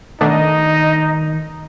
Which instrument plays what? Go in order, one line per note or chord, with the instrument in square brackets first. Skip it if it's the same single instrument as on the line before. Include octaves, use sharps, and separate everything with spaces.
[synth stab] B2 A3 D4 [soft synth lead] D#3 [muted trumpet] D#4 [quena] D#5